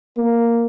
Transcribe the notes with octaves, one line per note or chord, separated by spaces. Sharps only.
A#3